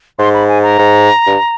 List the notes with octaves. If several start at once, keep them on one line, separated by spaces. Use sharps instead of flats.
G#2 C6
B5
G#5
A#5
G#2
G2